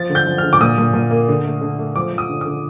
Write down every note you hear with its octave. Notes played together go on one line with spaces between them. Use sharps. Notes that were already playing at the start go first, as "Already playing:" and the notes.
Already playing: F3 A6
D3
G6
F3
D3 F6
D6
A#2 D#6
A#2
A#2
A#3
D3
A3
D3
A3
F3 D6
F3
D#6
D3
D3 D#6